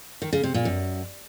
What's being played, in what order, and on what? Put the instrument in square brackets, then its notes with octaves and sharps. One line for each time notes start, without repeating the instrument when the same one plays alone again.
[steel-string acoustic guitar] D#3
C#3
C3
A#2
F#2